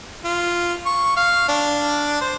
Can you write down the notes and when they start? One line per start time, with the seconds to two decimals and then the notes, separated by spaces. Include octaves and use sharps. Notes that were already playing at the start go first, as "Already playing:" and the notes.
0.25 F4
0.86 C#6
1.17 F5
1.49 D4
2.21 C5